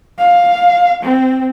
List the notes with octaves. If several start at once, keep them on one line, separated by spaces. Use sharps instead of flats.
F5
C4